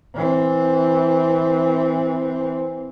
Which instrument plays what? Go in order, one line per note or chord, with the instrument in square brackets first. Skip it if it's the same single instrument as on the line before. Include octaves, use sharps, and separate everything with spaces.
[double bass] E3 C4